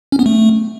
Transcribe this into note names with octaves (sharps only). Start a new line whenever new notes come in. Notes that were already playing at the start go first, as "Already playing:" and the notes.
C#4
B3
A3